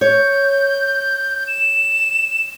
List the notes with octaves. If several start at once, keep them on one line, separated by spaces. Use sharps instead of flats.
C#5 G6
E7